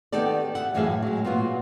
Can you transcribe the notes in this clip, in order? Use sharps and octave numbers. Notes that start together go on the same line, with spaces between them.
D#3 B3 D#4 G4 A4 D5
E5 F#5
F#2 A2 E3 G#4 E5 F5
F#3 G#3
A#2 B3 F4 F#4